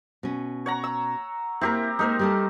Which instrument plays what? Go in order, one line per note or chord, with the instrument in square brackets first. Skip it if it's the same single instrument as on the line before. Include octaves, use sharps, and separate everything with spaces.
[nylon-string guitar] B2 C#4
[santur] C#5 F#5 A#5
E6
[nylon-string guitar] A#3 E4 [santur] C4 G4 A#4
[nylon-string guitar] G#3 A#3 [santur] D#4 A#4 C5
[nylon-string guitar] G3 A3 A4